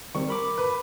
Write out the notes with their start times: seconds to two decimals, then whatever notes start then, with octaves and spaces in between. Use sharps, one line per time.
0.15 D#3 G3 C4 C#6
0.28 A#4 B5 D6
0.58 B4